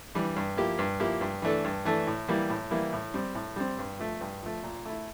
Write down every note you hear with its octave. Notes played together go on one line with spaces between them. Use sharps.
E3 G3 D4
G2
F3 A#3 E4 G4
G2
F3 A#3 E4 G4
G2
E3 A3 D4 A4
G2
E3 A3 D4 A4
A2
E3 G3 A#3 E4
A2
E3 G3 A#3 E4
A2
G3 C4
A2
G3 C4
G2
F3 A3
G2
F3 A3
A#2
A3 E4